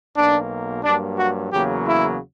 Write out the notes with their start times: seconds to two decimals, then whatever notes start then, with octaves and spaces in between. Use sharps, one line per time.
0.16 B1 B2 A#3 D4
0.84 G2 F#3 A#3 D4
1.18 F#4
1.52 E2 C#3 F#3 A#3 G4
1.86 E4